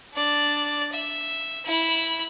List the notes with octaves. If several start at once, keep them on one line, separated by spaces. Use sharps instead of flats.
D4 D5
E5
E4 B5